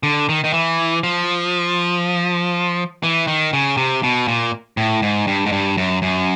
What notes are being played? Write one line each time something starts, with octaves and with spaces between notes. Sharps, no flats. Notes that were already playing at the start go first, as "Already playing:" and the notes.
D3
D#3
D#3
E3
F3
E3
D#3
C#3
C3
B2
A#2
A2
G#2
G2
G#2
G2
F#2
F#2